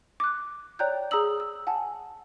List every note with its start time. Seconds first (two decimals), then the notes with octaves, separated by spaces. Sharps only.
0.20 D6 F#6
0.79 C#5 D5 G5 A#5 F#6 G6
1.11 G#4 A#5 D#6 E6 F#7
1.40 E6
1.67 F#5 G#5 A5